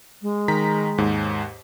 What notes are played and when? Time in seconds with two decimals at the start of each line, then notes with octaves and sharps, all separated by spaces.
0.22 G#3
0.48 D#3 A#5 B6
0.98 D#2 G#2